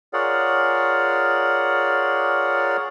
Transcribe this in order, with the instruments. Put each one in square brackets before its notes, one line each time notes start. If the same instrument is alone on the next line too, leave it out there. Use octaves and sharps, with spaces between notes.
[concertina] F4 G#4 A#4 C#5 D5 F#5